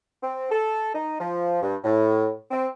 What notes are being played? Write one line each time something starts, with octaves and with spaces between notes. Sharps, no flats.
C4
A4
D#4
F3
G2
A2
C4